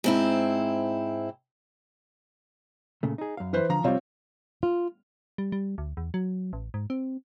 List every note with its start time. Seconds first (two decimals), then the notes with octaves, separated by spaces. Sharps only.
0.04 G#2 C4 E4
3.03 A#2 C#3 A3
3.18 D#4 G#4
3.37 F#2 F5
3.53 E3 B4 C5
3.69 D3 F3 A#5
3.84 C3 G3 C4 F4 C#5
4.63 F4
5.38 G3
5.52 G3
5.78 D2
5.97 E2
6.14 F#3
6.53 A1
6.74 G#2
6.90 C4